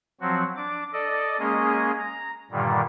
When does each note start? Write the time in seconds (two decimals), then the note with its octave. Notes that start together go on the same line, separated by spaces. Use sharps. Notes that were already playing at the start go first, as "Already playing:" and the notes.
0.21 F3 F#3 C4 F#4
0.57 D4 D6
0.93 A4 D5 D#5
1.39 G#3 A#3 C#4 G#4 D#5
1.99 A#5
2.51 G2 A#2 D3 D#3 G3